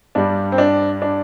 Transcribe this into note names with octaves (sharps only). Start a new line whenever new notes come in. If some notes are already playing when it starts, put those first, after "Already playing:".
G2 G3 D4
C4
D4
D4